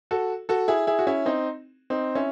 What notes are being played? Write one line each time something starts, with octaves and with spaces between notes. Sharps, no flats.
F#4 A4
F#4 A4
E4 G#4
E4 G#4
F#4
C#4 E4
C4 D#4
C4 D#4
C#4 E4